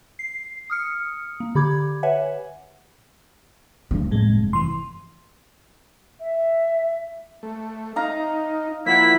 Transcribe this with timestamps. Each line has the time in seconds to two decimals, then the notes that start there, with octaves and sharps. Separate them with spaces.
0.19 C7
0.70 D#6 F6 C#7
1.40 A#3
1.55 D3 G4 B5 D6 G#6
2.03 B4 C#5 E5 F#5 G#5
3.91 F#1 D2 G2 A#3
4.11 F1 A2 G#3
4.53 E3 C6
6.19 E5
7.43 A3
7.96 D#4 F5 A#5
8.86 F3 A#3 E4 E5 F#5 B6